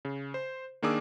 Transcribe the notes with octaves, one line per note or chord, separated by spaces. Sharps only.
C#3
C5
D#3 A#3 D4 G#4 D6 E6